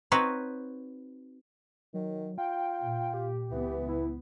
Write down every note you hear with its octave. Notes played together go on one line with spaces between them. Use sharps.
C4 D#4 F#4 B4 C#5
D#3 F#3
F4 G5
A#2
G4
C#2 E3 B3
E4